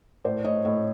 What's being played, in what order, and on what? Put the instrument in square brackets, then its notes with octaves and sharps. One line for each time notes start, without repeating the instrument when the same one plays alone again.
[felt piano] A2 C5 D5
A2 C#5 D#5
A2 C#5 D#5